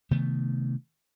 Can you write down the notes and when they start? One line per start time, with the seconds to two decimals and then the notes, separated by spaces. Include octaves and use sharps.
0.11 C3 D#3 A3 B3